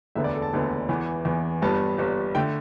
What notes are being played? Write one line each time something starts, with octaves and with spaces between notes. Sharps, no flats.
E1 D2 D3 B3 E5
D5
A4
A5
E1 D2 D3 B3
E2 E3 B3
E2 E3 B3
G1 G2 G3 B3 A5
G1 G2 G3 B3
D3 A3 G5